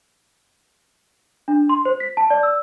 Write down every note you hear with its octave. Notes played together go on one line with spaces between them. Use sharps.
D4
C6
C5
B6
A5
D5
E6